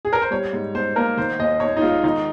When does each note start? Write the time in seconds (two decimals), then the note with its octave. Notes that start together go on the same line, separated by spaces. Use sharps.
0.05 G#4
0.13 A#4
0.22 C5
0.31 G3 C#5
0.53 G#2
0.75 G#2 C5
0.96 A#3 A#4
1.17 D#3 C5
1.39 D#2 D#5
1.60 D#2 C#5
1.77 D#4
1.81 G#3 F4
2.04 D#3 D#4